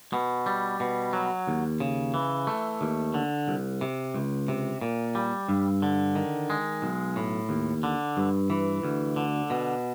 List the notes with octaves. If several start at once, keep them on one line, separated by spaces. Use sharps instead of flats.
B2
G3
B2
F#3
D#2
C#3
E3
A3
D#2
D3
C2
C3
C#2
C3
A#2
G3
G2
D3
D#3
G#3
B1
A2
D#2
D3
G2
E3
D2
D3
B2